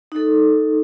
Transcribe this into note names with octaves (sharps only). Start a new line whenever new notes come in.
D#4 A4